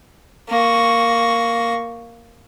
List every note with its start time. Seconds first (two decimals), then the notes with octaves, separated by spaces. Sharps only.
0.49 A#3 C#6